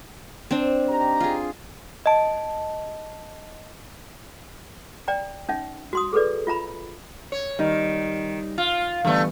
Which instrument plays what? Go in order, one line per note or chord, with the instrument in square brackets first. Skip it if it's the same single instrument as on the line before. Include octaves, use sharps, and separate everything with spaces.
[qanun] C4 D4
[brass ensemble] D#4 G4 A#5
[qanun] F4 G#4
[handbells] D#5 A5
[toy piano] D5 G5 A#5
C#4 D#4 E5
F#4 C6 D#6
G#4 A4 B4 D5
F4 E5 A#5 B5
[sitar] C#5
[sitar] D#3 [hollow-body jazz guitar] G3 D#4
[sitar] F4
[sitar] D3 A3 [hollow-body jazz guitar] E3 G3 B3